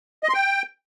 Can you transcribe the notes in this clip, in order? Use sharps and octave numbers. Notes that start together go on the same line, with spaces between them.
D#5
C6
G5